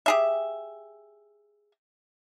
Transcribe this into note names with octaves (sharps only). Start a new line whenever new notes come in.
G4 G#4 E5